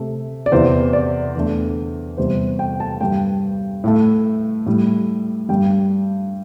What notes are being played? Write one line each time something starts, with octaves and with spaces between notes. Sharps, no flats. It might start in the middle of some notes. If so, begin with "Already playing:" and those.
Already playing: C3 A3
D5
E2 C3 E3 C5
D5
E2 D3 A3
E2 C3 G3 C5
G5
A5
G2 G3 G5
A2 A3
A2 G3
G2 G3 G5